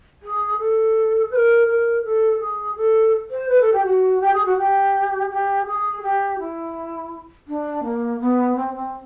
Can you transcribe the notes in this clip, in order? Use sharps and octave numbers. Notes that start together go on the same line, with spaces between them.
G#4
A4
B4
A#4
A#4
A4
G#4
A4
C5
B4
A4
G4
F#4
G4
G#4
F#4
G4
G4
G#4
G4
E4
D4
A#3
B3
C4
C4